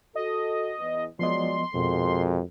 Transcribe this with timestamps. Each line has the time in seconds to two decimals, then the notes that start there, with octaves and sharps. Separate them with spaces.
0.15 F#4 A4 D#5
0.79 E2 B3
1.19 F3 F#3 G#3 B3 D5 D#5 C6
1.74 F2 B2 G#3 F#4 A#4